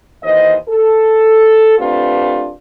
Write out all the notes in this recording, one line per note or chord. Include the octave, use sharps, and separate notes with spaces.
D#2 E3 C5 D#5
A4
A3 C4 D4 F4 G4 B4